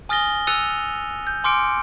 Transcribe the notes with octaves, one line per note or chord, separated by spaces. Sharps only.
G#5 D#6 F6 A6 A#6 G7
E6 F#6 A6 C#7 D#7 F7
G6
G#5 C6 D6 F6 C#7 D7